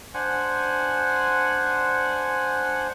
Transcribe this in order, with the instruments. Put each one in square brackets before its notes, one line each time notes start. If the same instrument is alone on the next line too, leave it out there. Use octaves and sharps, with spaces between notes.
[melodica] D4 C5 F#5 G#5